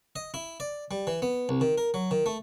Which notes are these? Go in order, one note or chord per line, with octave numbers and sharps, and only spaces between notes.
D#5
E4
D5
G3
E3
B3
C2
D#3
A#4
F#3
D#3
A3